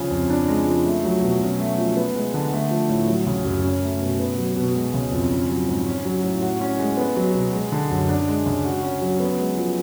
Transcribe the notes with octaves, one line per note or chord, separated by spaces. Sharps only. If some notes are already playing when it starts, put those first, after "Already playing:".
Already playing: C#3 F3
F2
D4
G#3
F3
A3
F#3
B2
C#4
A3
F3
B3
G#3
D3
A3
F3
A2
F#3
C#3
F#2
C#4
A3
B2
B3
F#3
B2
G#3
C#3
F2
C#4
F#3
G#2
C#4
F#3
A2
F#4
C#4
G#3
B3
F#3
B2
G#3
D3
F#2
D4
G#3
C#3
F#4
C#4
F#3
B3
G#3
F3